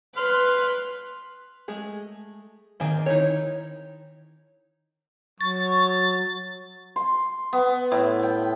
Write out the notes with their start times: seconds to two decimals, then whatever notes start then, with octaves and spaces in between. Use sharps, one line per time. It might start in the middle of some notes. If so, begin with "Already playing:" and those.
0.17 B4 C6 F6
1.68 G#3 A3 G#4
2.80 D#3 A#3 C4 G#4 G#5
3.06 D#4 E4 C#5
5.41 F#3 C#6 A6
6.96 C6
7.53 B3
7.92 A2
8.23 G5